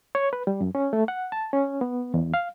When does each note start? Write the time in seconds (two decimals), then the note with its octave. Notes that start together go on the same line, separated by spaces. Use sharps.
0.15 C#5
0.33 B4
0.47 G3
0.61 F#2
0.75 C#4
0.93 A3
1.08 F#5
1.32 A5
1.53 C#4
1.81 B3
2.14 E2
2.34 F5